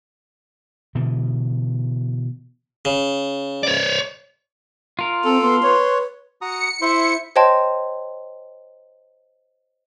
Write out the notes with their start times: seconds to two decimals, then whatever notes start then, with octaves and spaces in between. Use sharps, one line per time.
0.95 B2 D3 E3
2.85 C#3
3.63 C#5 D5
4.99 F4 A#4
5.25 C4 A4
5.42 B3 C6
5.63 B4 C#5
6.41 F#4 A#5 D#6 C#7
6.82 E4 C5 E5 C6
7.36 C5 C#5 D#5 G5 A5 C6